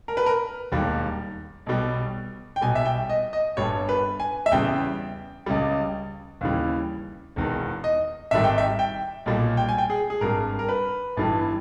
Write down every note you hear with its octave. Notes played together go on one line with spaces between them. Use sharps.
A#4
B4
A#4
E1 D#2 D#3 G3
B1 B2 G3
G5
B1 B2 G3 G#5
E5
G5
D#5
D#5
G1 G2 G3 C#5
B4
G#5
E5
E2 C#3 G3 G5
C#2 C#3 G3
D#2 C#3 E3 G3
E1 E2 D#3
D#5
G#1 G#2 D#3 G3 E5
G5
E5
G5
B1 A#2 G3
G5
G#5
G5
G#4
G#4
G#1 G2 G3 A#4
A#4
B4
G1 G2 E3 G3